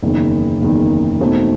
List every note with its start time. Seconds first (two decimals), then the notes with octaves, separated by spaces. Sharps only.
0.03 F#1 E2 D#3
0.61 F#1 E2 D#3
1.20 E2 B2 A3 C4 D#4